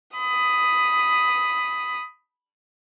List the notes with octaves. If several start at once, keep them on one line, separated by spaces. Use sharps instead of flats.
B5 D#6